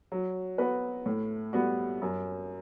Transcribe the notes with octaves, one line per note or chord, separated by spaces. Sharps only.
F#3
B3 F#4 B4
A2
G3 B3 F#4
F#2